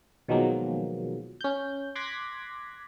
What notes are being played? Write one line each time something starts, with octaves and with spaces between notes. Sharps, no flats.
B2 D#3 F3 F#3 G#3 A#3
C#4 G6
C6 D6 F#6 G#6 A#6 B6